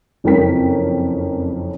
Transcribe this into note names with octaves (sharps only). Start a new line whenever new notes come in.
F#1 F2 C#4 A#4 G5 B6